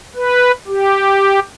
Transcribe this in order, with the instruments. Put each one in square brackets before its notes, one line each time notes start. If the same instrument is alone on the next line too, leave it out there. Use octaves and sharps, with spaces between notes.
[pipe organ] B4
G4